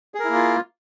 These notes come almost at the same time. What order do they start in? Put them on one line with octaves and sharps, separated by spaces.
G#4 A#4 E4 A#3 F4